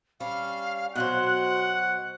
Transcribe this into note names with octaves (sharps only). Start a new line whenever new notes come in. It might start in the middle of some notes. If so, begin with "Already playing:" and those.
G3 C#4 F5
B2 F#3 C5 F#5 F#6